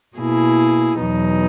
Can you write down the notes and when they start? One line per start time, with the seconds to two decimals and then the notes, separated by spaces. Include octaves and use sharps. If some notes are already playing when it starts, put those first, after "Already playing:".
0.17 B2 A#3 E4 G#4
0.99 E2 B2 F#3 B3 D#4